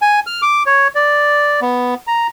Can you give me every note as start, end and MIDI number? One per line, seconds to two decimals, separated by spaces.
0.02 0.20 80
0.27 0.41 89
0.42 0.63 86
0.66 0.88 73
0.95 1.60 74
1.62 1.94 59
2.07 2.27 82